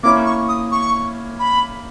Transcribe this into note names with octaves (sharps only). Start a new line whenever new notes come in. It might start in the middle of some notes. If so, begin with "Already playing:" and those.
A#3 C#4 E4 D6
C#6
D#6
C#6
B5